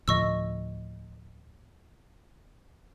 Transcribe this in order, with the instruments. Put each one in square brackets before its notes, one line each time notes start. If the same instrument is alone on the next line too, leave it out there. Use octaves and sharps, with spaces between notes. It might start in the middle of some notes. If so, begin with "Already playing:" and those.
[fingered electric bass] D2 A2 F3 [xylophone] D#5 C#6 E6